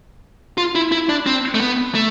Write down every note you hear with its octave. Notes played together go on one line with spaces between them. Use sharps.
F4
E4
E4
D4
C4
A3
B3
A3